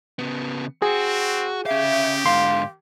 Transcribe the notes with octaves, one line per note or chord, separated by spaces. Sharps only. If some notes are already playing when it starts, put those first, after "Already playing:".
C#3 B3
C4 F#4 G#4
C#4 G4 E5 F5
G#2 D3 F5 C6